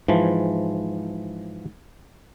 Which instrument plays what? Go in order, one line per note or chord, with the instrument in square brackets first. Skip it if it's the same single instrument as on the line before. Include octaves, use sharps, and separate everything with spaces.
[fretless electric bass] G#2 [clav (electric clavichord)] E3 F3